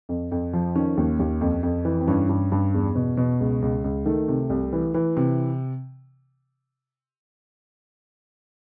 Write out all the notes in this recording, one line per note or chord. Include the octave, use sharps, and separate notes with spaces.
F2
F2
F3
D#3 C#4
D#2
D#2
F2
F2
E3
C4
G2 C#4
G2
G2
E2
B2
B2
C#2
C#2
C#2
D#3 A3
C3
C2
E3
E3
C3